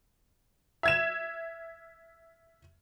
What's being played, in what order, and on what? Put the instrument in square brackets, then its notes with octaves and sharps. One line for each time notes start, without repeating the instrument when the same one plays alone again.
[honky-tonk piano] E5 G#6 E7